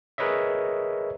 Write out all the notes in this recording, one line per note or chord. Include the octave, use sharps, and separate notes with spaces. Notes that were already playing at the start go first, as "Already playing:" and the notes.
G#4 A#4 B4 C#5 D#5 E5